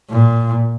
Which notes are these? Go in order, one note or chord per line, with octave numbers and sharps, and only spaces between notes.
A#2